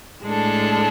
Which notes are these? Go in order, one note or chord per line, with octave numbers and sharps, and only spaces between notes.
A2 G#3 D4 A4